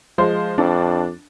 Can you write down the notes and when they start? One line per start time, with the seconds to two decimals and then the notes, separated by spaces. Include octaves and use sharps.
0.18 F3 G#3 C5
0.58 F2 D4